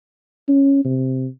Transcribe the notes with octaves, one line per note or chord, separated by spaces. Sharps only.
C#4
C3